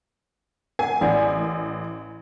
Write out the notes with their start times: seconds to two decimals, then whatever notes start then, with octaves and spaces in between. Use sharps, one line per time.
0.79 A#4 F#5 G#5
1.01 A1 D5 F#5 G#5